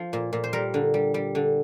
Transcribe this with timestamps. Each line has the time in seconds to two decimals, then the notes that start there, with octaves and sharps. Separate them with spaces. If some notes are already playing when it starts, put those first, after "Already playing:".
Already playing: F3
0.13 A#2
0.33 A#2
0.44 C5
0.53 G3 A#4
0.74 D3
0.94 G3
1.14 G3
1.35 D3